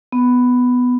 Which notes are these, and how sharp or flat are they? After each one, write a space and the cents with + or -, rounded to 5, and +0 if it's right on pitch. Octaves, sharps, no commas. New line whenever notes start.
B3 +5